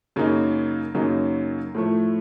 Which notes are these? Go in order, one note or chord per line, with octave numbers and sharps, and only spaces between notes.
F#2 C#3 F#3 A#3 D#4
F#2 C#3 F#3 A#3 D#4
A2 F3 A3